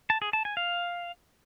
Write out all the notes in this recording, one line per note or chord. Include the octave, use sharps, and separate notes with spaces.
A5
G#4
A5
G#5
F5